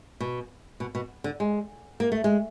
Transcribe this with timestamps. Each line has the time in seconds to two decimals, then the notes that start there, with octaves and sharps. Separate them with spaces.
0.20 B2
0.80 B2
0.95 B2
1.24 D3
1.40 G#3
2.00 A#3
2.12 A3
2.24 G#3